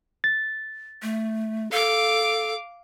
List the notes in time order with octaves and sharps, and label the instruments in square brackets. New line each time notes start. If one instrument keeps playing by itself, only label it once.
[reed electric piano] A6
[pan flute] A3
[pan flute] A4 [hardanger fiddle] F5 D6